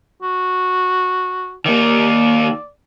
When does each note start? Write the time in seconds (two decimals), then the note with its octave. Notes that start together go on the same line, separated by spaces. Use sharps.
0.22 F#4
1.66 D#3 A#3 D5